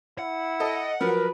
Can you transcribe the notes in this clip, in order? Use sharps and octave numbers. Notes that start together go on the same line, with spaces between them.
E4 F#5
A4 D#5
F3 F#3 A#4 B4